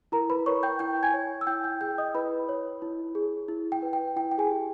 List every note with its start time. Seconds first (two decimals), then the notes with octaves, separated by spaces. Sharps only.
0.12 E4 A#4 A#5
0.30 B4 B5
0.46 A#4 C#5 C#6
0.63 G5 G6
0.79 E4 G5 G6
1.03 G#5 G#6
1.14 C#5
1.41 E6
1.47 E4 G5 G6
1.64 G5 G6
1.81 G#4 G5 G6
1.98 D#5 D#6
2.15 E4 B4 B5
2.49 C#5
2.82 E4
3.15 G#4
3.48 E4
3.72 G5
3.82 B4
3.93 G5
4.16 E4 G5
4.32 G5
4.38 G#4 G#5
4.50 G4